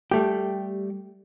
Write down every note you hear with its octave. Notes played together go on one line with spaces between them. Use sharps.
G3 A3 G4